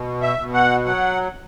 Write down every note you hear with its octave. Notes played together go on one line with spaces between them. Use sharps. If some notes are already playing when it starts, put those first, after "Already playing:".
Already playing: B2
E5
B2
F#5
F#3 F#5